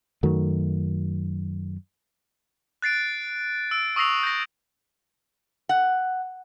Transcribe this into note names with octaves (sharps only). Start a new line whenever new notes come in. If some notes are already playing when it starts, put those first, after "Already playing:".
F#2 D#3 F#3 A3
F#6 A6 C7 D7
E6 D7
C#6 D#6 E6 A#6 C7 F7
G6 A#6
F#5